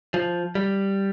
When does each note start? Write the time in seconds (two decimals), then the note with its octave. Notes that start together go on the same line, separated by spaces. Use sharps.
0.14 F3
0.55 G3